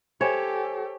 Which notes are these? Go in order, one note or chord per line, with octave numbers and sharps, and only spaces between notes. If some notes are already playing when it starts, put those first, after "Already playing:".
G4 A4 C5 C#5 G#5